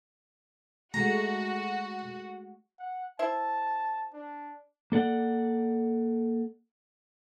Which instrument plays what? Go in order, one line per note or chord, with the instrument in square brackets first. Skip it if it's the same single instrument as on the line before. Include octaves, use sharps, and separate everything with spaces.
[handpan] G#3 A3 [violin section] F#4 [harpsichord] A#5
[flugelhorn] F#5
[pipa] E4 C5 E5 [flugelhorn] A5
[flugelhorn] D4
[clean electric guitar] A#3 A4 D5 F#5